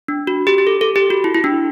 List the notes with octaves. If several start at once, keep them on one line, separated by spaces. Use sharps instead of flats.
D4
F#4
G4
G4
A4
A4
G4
F#4
E4
E4
D4